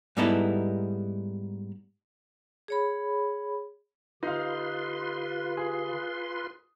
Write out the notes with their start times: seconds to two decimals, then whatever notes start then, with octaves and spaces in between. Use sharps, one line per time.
0.17 G#2 G3 B3 D#4 E4 A4
2.68 G#4 C#5 B5
4.23 D3 D#4 F4 G4 B4 F5 C6
5.57 G#4